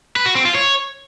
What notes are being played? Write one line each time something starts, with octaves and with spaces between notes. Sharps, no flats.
B4
F#4
C4
F4
C#5